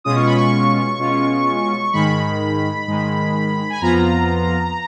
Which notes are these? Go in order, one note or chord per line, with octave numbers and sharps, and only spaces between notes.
B2 G#3 C#4 F4 D#6
C#6
B5
C#6
B2 G#3 C#4 F4
G#2 D#3 G#3 B5
G#2 D#3 G#3
G#5
F2 F3 B3 F4 A#5